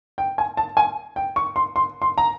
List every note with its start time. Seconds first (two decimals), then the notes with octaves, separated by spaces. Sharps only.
0.18 G5
0.38 G#5
0.57 A5
0.77 G#5
1.16 G5
1.36 C#6
1.56 C6
1.76 C6
2.02 C6
2.18 A#5